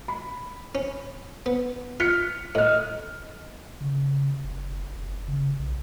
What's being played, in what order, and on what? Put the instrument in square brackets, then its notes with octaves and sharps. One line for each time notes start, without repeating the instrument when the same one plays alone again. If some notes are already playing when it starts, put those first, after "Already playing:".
[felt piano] B5
[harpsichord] C#4
B3
[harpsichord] F4 [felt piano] F6 B6 C#7
[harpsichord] A2 [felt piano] D#5 F6
[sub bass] C#3
F#1
F#1
C#3
B1